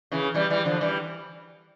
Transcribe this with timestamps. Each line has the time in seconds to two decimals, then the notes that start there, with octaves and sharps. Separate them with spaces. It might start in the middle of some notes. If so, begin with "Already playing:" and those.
0.11 C#3 E3
0.34 E3 G3
0.50 E3 G3
0.65 D3 F3
0.81 E3 G3